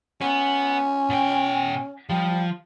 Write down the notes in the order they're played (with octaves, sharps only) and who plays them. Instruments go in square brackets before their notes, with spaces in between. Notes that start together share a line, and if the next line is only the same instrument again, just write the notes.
[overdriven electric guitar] B3 [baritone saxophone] C#4
[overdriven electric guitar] B2 G5
[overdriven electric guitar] F3 [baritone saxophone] G3